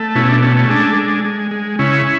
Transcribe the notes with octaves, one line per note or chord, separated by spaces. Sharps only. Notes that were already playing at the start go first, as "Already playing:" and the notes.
Already playing: A3
B2 C#4 E4
D4
A3 C#4
C#4
G#3 D4
G#3
G#3
G#3
C#3 C#4 E4